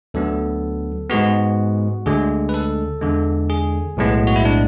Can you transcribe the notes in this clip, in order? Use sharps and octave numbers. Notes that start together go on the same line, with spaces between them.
D2 D3 F#3 B3 A4
G#2 G#3 B3 F#4
D2 D3 G#3 G#4
B4
A4
E2 D3 G#3
G#4
B1 A2 G#3 B3
F#4
E4
D4